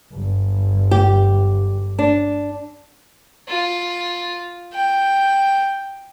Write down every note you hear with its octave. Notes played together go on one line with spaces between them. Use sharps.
G1
G4
D4
F4
G5